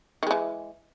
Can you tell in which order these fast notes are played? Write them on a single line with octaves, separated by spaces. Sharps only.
D#3 G#3 E3